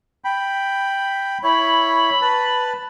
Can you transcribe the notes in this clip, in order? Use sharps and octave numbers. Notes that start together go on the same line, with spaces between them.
G5 B5
E4 C#5 B5
B4 A5